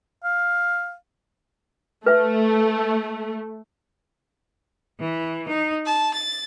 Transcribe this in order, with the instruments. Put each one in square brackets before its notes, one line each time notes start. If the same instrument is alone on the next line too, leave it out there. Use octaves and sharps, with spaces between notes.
[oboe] F5
[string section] A3 [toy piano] B4 E5
[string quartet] E3
D#4
A5
A6